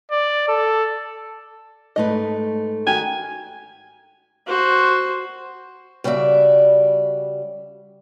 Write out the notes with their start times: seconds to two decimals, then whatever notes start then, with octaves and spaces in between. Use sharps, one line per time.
0.11 D5
0.48 A4
1.96 G#2 A3 B4 D#5
2.86 D#3 F#4 G4 G#5
4.47 F#4 C5
6.04 C#3 G3 F#4 D5 E5